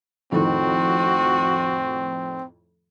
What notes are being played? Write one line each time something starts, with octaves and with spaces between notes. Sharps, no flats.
F2 A2 D#3 C4 F#4